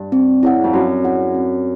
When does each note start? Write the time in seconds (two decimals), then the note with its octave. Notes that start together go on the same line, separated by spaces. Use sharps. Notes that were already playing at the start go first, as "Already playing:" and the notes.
Already playing: G2
0.12 C4
0.43 E4 G#4 C#5 F#5
0.64 F2
0.73 F#2 C4
1.04 E4 G#4 C#5 F#5
1.35 C4